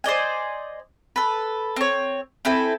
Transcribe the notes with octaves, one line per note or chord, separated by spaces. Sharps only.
C5 D5 D#5 G#5
A4 B4
C4 C#5
C4 E4 A4 G#5